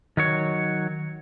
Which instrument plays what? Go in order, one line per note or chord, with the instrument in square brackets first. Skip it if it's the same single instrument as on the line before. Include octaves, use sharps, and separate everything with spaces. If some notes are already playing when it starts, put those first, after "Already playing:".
[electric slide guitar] D#3 F#3 C#5